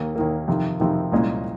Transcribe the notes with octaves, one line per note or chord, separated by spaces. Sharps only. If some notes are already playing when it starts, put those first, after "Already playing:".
Already playing: D#2 D#3 A#3
D#2 D#3 A#3
F2 C3 D#3
F2 C3 D#3
C2 A#2 G#3 C#4